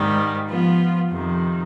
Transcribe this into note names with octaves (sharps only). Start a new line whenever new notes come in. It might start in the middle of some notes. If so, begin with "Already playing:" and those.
Already playing: G#2 D#3 G3
F3 B3 F4
F2 C3 D#3